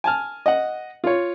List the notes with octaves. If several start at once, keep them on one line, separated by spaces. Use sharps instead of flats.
G#5 A5 F6
D#5 F#5
F4 C#5